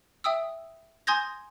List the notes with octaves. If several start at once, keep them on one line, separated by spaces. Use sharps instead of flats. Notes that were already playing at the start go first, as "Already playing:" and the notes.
E5 G5 D#6 E6
G#5 C6 D#6 G6 G#6 A#6